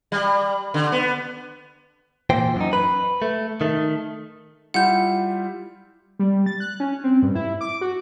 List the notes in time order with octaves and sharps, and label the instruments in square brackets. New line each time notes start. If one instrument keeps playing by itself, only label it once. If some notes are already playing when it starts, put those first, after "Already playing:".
[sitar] G3
D3
B3
[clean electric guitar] A#2 E3 C5 G5
F#2 D#4
B4
A3
D#3 A3
[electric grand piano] G3 E4 F4 [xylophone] F#5 G6
[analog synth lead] G3
A6
F#6
C#4
C4
G2
E4
D6
F#4